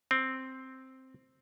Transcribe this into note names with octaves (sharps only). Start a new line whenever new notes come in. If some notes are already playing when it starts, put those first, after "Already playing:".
C4